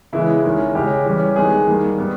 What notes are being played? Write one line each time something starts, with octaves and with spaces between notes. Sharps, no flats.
C#3 E3 G#3 B3 E4
D#3 G#3 C#4
C#3 G#3 C#4 G4
E3 G3 C#4
D#3 G#3 B3 G#4
D#3 G3 A#3
G3 B3